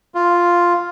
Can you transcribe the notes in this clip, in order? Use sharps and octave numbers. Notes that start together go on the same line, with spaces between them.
F4